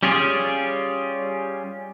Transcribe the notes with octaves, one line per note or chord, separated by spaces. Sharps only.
G3 C#4 F4 G4 G#4